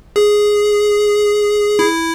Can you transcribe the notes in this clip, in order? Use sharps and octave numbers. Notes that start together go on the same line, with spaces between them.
G#4
E4